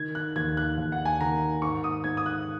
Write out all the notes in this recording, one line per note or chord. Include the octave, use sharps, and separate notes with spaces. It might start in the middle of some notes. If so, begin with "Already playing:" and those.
Already playing: D#3 G#6
F#6
D#2 G#6
F#6
D#2
F#5
G#5
D#3 A#5
G#2 C#6
D#6
G#2 G#6
D#6
F#6